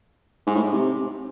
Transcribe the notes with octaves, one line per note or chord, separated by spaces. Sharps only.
G#2
A2
G#2
C3